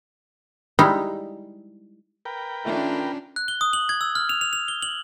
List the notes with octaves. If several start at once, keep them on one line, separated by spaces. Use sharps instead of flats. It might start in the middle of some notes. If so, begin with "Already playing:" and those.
G3 G#3 D#4 E4 G4
A#4 B4 G5
D#3 A3 C#4 D4 F4
F#6
G7
D#6
F#7
G#6
E6
F6
F7
F7
F7
G7
F#7